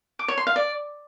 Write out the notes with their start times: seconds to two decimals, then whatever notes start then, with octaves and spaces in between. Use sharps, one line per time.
0.19 D6
0.28 C#5
0.38 C6
0.47 F5
0.56 D5